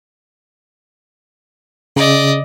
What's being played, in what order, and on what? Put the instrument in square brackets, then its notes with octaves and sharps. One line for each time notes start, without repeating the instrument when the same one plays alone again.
[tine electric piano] C#3 [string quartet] D5 D#5